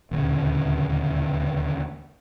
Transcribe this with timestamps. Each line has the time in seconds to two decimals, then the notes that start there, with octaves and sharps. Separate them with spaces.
0.11 D#1 D2 C#3